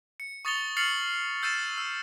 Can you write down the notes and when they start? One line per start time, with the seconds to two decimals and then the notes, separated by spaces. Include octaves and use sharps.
0.20 C#7
0.45 C#6 D#6 A6 C#7 F7 G7
0.77 F6 A6 C7 C#7 F7 F#7
1.42 E6 G6 A6 C7 D#7 E7
1.78 E6